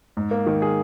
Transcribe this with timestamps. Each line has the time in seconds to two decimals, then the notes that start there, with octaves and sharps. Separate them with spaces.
0.17 G#2
0.31 A#3
0.47 D#3
0.62 G#4